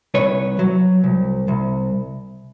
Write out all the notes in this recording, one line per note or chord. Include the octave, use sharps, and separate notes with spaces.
C2 B4 C#5
F#3
C2
C2